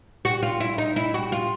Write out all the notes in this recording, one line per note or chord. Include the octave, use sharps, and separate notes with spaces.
F#4
F4
E4
D#4
E4
F#4
F4